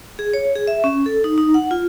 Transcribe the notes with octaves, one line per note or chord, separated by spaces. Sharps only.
G#4
C#5
G#4
E5
C#4
A4
D#4
D#4
F#5
F4